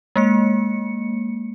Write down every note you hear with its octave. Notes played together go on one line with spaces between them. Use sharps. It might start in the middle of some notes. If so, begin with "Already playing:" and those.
G#3 A#3 C#7